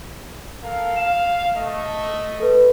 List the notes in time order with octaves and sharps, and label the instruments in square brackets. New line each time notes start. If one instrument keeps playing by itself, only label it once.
[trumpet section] A4 A#4 F5
[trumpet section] F5 [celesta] E7
[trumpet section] A3 D#5
[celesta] A4 B4